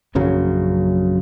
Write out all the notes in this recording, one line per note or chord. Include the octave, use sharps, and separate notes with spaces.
A#1 F#2 C#3 F#3